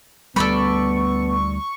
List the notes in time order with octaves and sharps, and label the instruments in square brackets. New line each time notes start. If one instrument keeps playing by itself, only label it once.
[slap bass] D2 G3 [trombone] B3 [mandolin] A4 D5 B5 [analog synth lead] C#6